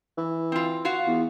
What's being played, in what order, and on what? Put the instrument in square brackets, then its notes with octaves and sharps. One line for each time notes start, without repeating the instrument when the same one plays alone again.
[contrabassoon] E3
[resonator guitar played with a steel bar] C4 F4
F4 F#4 F5
[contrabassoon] E2